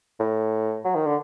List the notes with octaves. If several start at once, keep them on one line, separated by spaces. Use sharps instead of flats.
A2
F#3
D#3
D3